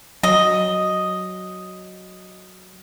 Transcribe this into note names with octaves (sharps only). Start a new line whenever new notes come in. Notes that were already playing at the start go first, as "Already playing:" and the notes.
F#3 D#5